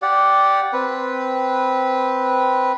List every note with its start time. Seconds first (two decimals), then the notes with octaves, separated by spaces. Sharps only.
0.02 G4 D5 F#5
0.73 C4 B4